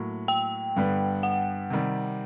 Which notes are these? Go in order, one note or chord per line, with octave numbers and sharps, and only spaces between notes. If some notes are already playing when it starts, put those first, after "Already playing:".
Already playing: A2 F#3 A#3
G5
G2 D3 G3 B3
F#5
C3 D#3 G3